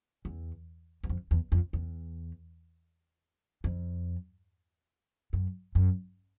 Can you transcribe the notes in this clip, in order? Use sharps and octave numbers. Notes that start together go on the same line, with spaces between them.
E2
E2
F2
E2
F2
E2
F2
F#2
F#2